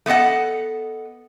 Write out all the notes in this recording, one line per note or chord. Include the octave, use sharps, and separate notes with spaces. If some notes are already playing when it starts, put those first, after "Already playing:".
A3 B3 A4 D#5 F#5